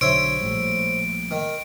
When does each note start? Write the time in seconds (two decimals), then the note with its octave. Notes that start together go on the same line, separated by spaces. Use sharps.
0.01 B1 D3 F#3 C5 C#5 E5 D7
0.41 A#1 A2 G3
1.31 D#3